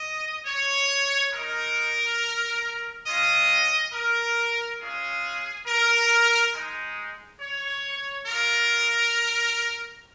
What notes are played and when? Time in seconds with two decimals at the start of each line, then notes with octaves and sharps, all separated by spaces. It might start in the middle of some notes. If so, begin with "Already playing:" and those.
Already playing: D#5
0.46 C#5
1.32 G#3 D#4 A#4
3.05 G#3 C#4 F4 D#5
3.92 A#4
4.80 G#3 C#4 F4 G#4
5.66 A#4
6.53 G#3 D#4
7.39 C#5
8.26 G#3 F4 A#4